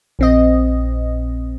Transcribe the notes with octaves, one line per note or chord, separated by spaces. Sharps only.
A#1 C4 D#5